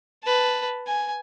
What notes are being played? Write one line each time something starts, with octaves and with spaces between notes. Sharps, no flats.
B4 A5
G#5